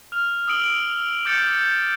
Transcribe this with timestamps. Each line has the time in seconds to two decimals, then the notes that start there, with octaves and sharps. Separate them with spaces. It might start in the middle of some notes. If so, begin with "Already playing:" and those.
0.12 F6 F7
0.48 D#6 E6 D7 F#7 G7
1.25 D6 G6 A6 C#7